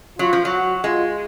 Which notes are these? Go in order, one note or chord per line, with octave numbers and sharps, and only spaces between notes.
F#3 F4
F3
F#3
F#4
G#3 F4